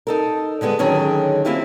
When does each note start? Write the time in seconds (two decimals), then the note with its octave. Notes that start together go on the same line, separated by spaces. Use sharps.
0.07 D#4 A4 A#4
0.61 D3 G3 G#3 B3
0.79 D3 D#3 F#3 C#4 G#4
1.45 A#3 C4 E4 F4 G4